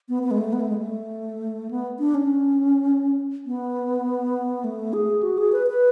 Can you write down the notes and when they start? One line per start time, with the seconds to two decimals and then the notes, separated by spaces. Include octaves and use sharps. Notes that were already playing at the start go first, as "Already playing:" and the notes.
0.09 B3
0.23 B3
0.31 G#3
0.38 A3
0.53 B3
0.61 A3
0.69 G#3
0.78 A3
1.71 B3
1.99 D4
2.14 C#4
3.46 B3
4.64 A3
4.93 G#4
5.23 F#4
5.38 G#4
5.52 B4
5.67 B4